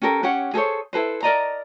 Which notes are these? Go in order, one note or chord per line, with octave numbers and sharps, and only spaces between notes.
C#4 G4 A4 A#4
C#4 G4 C#5 F#5
G#4 A4 C5 C#5
E4 A4 B4 C5
A#4 D5 D#5 A#5